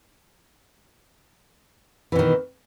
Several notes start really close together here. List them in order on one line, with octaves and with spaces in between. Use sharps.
E3 B2 D#3